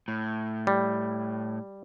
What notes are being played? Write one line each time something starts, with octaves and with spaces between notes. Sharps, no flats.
A2
G3